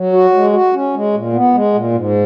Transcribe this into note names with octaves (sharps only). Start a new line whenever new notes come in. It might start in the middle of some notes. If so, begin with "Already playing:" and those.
Already playing: F#3
F#4
G#3
F#4
C#4
G#3
A#2
B3
G#3
A#2
G#2